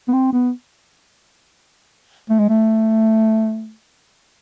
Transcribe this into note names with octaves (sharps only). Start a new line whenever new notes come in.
B3
C4
B3
A3
G#3
A3